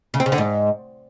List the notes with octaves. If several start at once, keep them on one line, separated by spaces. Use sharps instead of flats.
C#3
C4
C#3
D3
G#2